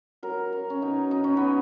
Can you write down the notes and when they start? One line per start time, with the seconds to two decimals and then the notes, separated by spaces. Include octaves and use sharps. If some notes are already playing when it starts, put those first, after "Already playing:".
0.23 F#3 A#4
0.51 F#3 A#4
0.70 C#4
0.82 B2 D#4
1.11 B2 D#4
1.24 C#4
1.37 F#3 B3